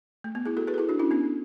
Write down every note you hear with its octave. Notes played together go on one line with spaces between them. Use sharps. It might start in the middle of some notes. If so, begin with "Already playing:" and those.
A3
B3
E4 G#4
F#4 A4
G#4 B4
A4
E4 G#4
D4 F#4
C#4 E4
B3 D4